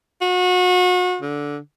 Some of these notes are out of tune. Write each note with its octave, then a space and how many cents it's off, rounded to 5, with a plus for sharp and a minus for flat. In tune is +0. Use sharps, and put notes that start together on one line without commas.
F#4 -35
D3 -10